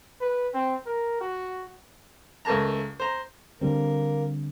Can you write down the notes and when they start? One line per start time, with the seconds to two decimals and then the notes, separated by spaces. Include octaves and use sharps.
0.21 B4
0.54 C4
0.86 A#4
1.21 F#4
2.45 C#2 A3 A#3 A5 A#5
3.00 C5 A#5
3.61 D3 G3 A#3 C4 A#4